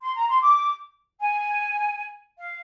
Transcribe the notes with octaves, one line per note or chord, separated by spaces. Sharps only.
C6
A#5
C6
D6
G#5
F5